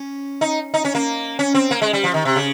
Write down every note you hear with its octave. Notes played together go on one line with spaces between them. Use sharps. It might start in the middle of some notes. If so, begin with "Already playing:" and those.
Already playing: C#4
D#4
D#4
C#4
A#3
C#4
C4
A#3
G#3
G3
F3
D#3
C3
C#3